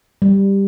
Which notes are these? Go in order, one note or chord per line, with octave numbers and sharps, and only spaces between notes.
G3